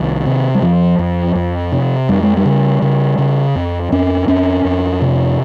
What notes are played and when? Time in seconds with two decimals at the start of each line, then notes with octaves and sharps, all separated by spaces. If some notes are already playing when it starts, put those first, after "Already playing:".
Already playing: C2 D#3
0.26 C3
0.55 G3
0.62 F2 F3
0.99 F2
1.35 F2
1.72 C3
2.09 F2 G3
2.23 G#3
2.37 G3
2.45 C#3
2.82 C#3
3.18 C#3
3.55 F2
3.92 F2 C#4
4.28 F2 C#4
4.65 F2
5.02 C3